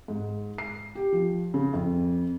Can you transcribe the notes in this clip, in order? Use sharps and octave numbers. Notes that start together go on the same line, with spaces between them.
G#2
C7
G4
F3
C#3
F2